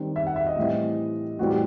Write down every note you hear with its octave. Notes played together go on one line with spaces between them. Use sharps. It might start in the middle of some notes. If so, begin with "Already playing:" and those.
Already playing: D#3 G3 C4
E5
F#5
E5
D#5
A2 E3 G3 C4
A2 E3 G3 C4 F#4
G4